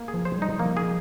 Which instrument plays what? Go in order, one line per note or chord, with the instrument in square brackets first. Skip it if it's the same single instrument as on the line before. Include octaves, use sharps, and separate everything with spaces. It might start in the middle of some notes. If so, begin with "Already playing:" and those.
Already playing: [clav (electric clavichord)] A#3
G#4
[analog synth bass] F3
[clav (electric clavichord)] C5
[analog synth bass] G3
[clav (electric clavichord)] D#4
[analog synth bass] F3 [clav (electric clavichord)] A#3
[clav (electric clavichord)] G#4